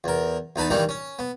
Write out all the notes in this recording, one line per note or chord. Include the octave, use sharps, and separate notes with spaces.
E2 A#4
E2 D#4 B4 A5
G2 D#3 E3 G3 D#4
C#4
B3